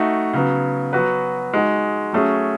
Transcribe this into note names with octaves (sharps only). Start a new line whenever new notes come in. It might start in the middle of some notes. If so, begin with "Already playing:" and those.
Already playing: A3 D#4 F#4
C#3 F#3 B3
F#3 B3 F#4 B4
G#3 D#4 F#4
F#3 A3 C#4 G#4